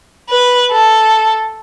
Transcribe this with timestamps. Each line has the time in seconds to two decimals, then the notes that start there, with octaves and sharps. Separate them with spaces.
0.30 B4
0.72 A4